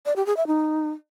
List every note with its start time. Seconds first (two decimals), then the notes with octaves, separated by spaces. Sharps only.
0.06 D5
0.16 G4
0.26 G#4
0.37 E5
0.47 D#4